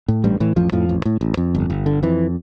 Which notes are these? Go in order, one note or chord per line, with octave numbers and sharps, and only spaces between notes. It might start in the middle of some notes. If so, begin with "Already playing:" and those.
A2
A1 G2 G3
A2 E3
A1 F2 F3
F2 A2 F3
A1
A2
A1
F2
G1
G1
D3
F2 E3